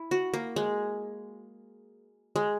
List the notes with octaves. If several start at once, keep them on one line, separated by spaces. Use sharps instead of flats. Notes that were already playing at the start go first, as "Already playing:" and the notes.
Already playing: E4
F#4
A#3
G#3
G#3